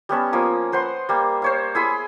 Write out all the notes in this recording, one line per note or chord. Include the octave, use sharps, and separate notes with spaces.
G3 B3 C#4 A5
F3 A#3 D#6
B4 C5 F#5 C6
G3 A#3
C5 C#5 F5
E4 G#4 B5 C6